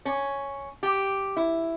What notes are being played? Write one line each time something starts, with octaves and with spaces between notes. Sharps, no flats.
C#4
G4
E4